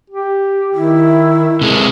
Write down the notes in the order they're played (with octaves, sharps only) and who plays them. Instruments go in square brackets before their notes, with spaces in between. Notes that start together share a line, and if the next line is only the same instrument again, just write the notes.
[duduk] G4
[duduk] D#3 [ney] E4
[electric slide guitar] C3 G#3